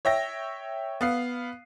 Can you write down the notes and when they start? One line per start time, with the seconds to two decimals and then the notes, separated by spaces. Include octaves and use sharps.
0.05 C#5 E5 G5 A#6
1.01 B3 F5 C7